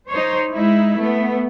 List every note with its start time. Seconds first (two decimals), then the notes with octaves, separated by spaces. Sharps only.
0.10 D#4 C5 C#5
0.53 G#3 D#4 E4
0.97 A3 B3